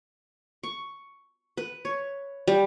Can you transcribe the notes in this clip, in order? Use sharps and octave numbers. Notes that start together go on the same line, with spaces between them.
C#6
B4
C#5
G3